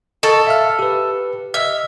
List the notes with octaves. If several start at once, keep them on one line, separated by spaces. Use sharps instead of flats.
A4 D#5 C#6 A6
E5 F5 F6
G4 B4
D#5 E5 F6